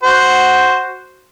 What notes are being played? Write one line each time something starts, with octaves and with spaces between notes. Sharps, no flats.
F#4 C5 F#5